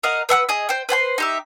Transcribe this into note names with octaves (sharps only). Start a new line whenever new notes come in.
A#4 D#5 F5 F#5
B4 E5 F#5 E6
G#4 D#5
C5 G5
B4 C5 G5 C6
D#4 G4 E5